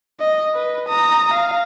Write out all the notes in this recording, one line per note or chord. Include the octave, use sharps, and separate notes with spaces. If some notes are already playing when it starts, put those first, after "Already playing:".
D#5
B4
A#5 D#6
F5